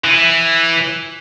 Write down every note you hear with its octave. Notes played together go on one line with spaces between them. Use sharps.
E3